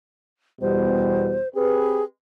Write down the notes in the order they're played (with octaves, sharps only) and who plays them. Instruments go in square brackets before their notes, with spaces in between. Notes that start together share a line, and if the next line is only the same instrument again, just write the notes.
[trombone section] E2 B2 G3 [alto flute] C5
[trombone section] C4 G4 B4 [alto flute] G#4